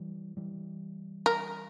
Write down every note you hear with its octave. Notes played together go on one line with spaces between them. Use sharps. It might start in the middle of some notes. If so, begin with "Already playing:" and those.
Already playing: E3 G3
E3 G3
A#4